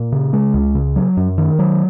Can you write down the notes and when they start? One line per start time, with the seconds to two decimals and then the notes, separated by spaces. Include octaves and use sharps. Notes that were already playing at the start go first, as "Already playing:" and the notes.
Already playing: A#2
0.12 C#3
0.33 G#3
0.54 C#2
0.75 C#3
0.96 F#3
1.17 F#2
1.38 D#3
1.59 F#3